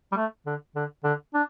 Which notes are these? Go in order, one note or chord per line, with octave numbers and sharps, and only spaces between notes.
G3
A3
D3
D3
D3
D4